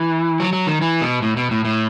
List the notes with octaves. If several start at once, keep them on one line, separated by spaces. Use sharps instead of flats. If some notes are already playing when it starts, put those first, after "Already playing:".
Already playing: E3
F#3
F#3
D#3
E3
B2
A2
B2
A2
A2